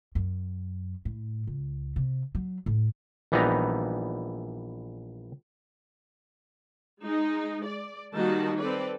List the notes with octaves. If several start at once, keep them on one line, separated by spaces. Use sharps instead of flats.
F#2
A2
C#2
C3
F#3
A2
A#1 E3 G3 B3 D#4 A#5
G#3 D#4
D5
D#3 G3 A#3 D#4 F#4 A5
C4 A4 B4 D5